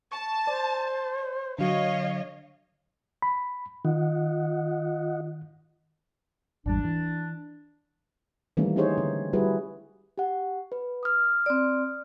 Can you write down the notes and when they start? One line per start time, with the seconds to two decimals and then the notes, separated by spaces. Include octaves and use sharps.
0.12 A5 C#6
0.47 C5 D5
1.59 D3 F#3 C#5 D#5 F5
3.22 B5
3.85 D#3 F4 D#5 F#5
6.66 G#1 E2 G3 D4
6.84 E3
8.57 D#3 E3 G3 A3 A#3 C#4
8.76 C#4 D#4 G4 G#4 C5 C#5
8.98 D3
9.33 G3 E4 F#4 G#4 B4
10.18 G4 F#5
10.72 B4
11.03 D#6 F6
11.46 C4 D5